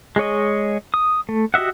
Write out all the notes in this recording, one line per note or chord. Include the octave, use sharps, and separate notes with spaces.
G#3 G#4 C#5 D#5
D#6
A3
F#4 G4 D#5 E5 F#5